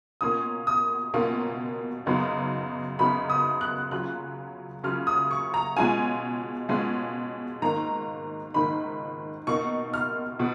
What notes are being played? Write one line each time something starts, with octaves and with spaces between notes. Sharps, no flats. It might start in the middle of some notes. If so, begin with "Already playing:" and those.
B2 A#3 C#4 F4 D#6
D#6
B2 A#3 C#4 F4
F#2 C#3 F#3 B3 D#4
F#2 C#3 F#3 B3 D#4 B5
D#6
F#6
C#3 F#3 C#4 F4 F#6
C#3 F#3 C#4 F4 F6
D#6
C#6
A#5
B2 G#3 C#4 F4 G#5
B2 G#3 C#4 F4
G#2 D#3 A#3 D#4 A#5
G#2 D#3 A#3 D#4 B5
B2 A#3 D#4 C#6
F6
B2